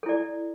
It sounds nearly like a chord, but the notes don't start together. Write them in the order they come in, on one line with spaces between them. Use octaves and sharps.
A4 E4 D5